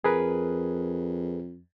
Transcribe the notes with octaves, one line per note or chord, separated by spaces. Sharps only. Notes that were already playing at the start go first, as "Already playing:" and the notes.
F2 G#4 A#4 B4